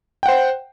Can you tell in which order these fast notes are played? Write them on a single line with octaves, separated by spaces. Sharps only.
G5 F#5 C5